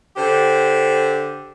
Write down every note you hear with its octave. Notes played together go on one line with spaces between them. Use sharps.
D3 G4 C5